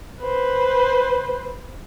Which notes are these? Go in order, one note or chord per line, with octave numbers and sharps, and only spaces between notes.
B4 C5